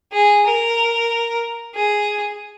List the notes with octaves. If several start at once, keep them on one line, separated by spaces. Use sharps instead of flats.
G#4
A#4
G#4